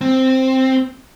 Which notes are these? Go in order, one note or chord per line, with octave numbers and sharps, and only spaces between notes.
C4